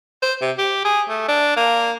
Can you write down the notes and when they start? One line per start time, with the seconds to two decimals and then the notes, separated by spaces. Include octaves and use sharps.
0.22 C5
0.41 C3
0.58 G4
0.85 G#4
1.09 A3
1.28 D4
1.56 A#3